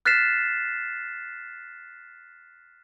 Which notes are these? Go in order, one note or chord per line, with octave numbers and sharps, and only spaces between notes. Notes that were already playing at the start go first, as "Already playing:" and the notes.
F6 F#6 A6 B6 C7 E7